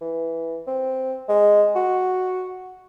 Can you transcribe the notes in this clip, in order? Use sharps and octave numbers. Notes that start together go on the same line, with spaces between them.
E3
C4
G#3
F#4